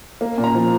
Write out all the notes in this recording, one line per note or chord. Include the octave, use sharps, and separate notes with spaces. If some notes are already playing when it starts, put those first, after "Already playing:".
A#3
A#2
A#5
F3